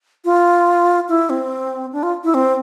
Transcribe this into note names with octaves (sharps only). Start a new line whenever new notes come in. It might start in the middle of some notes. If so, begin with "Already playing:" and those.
F4
E4
C4
D4
F4
E4
C4